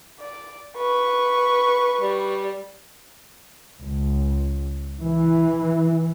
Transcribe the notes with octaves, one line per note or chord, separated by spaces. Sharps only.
D5
B4 C#6
G3
C#2
E3